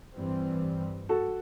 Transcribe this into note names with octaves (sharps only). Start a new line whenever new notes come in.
G2 E3 G3 C4
F#4 A4